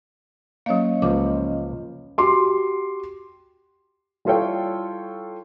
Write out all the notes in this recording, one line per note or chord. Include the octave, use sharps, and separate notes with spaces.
F#3 A#3 C#4 C#5 D#5 F5
C#2 F3 D6
F#4 G4 C6 D6
G3 E4 F4 A4 C#5 G5